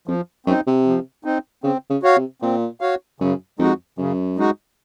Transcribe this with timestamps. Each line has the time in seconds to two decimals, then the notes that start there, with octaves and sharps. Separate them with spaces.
0.08 F2 F3
0.46 F#2 C4
0.50 D#4
0.67 C3
0.86 F3
1.24 C4 D#4
1.64 C#3 C4
1.90 C#3
2.03 F#4 C#5 F5
2.16 C3
2.42 A#2 C4
2.81 F#4 C#5 F5
3.20 F#2 C#3
3.59 F2 G#3 D#4 F#4
3.98 F#2 C#3
4.37 G#3 D#4 F#4